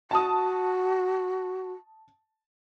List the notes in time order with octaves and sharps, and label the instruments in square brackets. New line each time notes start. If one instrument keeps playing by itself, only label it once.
[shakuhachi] F#4 [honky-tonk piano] A5 D#6